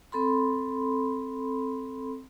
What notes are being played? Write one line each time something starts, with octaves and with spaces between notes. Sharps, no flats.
C4 A4 B5 C6